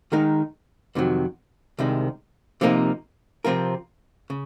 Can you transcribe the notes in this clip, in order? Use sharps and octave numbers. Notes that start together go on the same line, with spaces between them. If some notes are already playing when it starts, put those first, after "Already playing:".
D#3 G#3 D#4 A#4
F2 C3 D#3 F#3
C2 C3 D#3 G#3
C3 F3 A#3 D#4 A#4
C3 F3 C4 F4 A#4
C#3